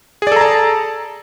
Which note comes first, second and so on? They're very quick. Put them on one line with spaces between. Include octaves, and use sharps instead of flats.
G#4 D5 A4 A#5 A5